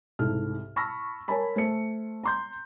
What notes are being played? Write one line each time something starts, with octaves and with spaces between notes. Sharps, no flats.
C2 G#2 A4 F6
A5 B5 C#6 E6 F6 A#6
A#4 C#5 G#5 A5 B5
A3 C5 C#7
A#5 C6 G6